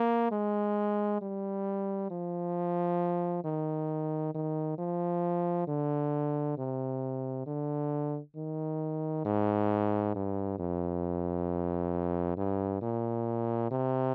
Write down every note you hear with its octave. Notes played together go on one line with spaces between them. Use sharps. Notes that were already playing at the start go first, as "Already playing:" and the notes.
Already playing: A#3
G#3
G3
F3
D#3
D#3
F3
D3
C3
D3
D#3
G#2
G2
F2
G2
A#2
C3